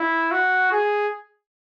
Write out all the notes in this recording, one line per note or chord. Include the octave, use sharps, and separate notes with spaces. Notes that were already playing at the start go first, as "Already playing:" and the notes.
Already playing: E4
F#4
G#4